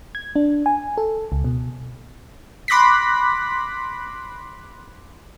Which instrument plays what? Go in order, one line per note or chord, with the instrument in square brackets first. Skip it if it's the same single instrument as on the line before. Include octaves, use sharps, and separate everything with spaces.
[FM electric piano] G#6
D4
G#5
A4
C#2
B2
[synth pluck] B5 C6 D6 F#6 A#6 B6